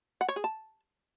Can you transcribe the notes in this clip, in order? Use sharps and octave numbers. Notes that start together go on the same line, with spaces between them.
F#5
C#5
G#4
A5